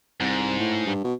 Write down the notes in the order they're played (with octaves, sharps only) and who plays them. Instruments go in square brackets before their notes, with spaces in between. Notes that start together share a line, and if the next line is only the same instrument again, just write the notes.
[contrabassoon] C2 [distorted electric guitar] G#2
[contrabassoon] A2
G2
B2